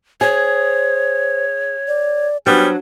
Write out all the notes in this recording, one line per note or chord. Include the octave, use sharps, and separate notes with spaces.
G#4 C5 C#5
D5
F#3 G3 B3 C#4 D4 C5